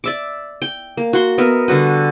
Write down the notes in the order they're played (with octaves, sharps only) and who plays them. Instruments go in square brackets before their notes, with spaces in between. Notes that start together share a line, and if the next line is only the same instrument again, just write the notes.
[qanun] D5 E5 D6
G5
A#3
F#4 C6
B3 A#4 D#5 E5
D3 G3 F#4 B4